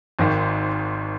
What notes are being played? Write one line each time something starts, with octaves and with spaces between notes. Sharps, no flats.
G#1 G#2 D#3